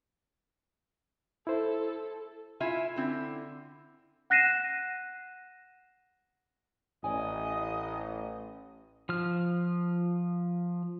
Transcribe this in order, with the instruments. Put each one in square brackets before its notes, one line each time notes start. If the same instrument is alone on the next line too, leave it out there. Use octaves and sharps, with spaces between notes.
[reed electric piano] E4 C5 [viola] A4
[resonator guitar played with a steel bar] E4 F4 E5 G#5
D3 C4 E4
[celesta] F#5 F#6 A#6 C7 D#7 E7
[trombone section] A1 [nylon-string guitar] D5 G#5 [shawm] D#5
[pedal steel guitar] F3 F6